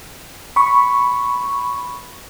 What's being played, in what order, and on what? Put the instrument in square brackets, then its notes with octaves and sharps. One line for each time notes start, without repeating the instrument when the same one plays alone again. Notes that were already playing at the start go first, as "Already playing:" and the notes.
[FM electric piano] B5 C#6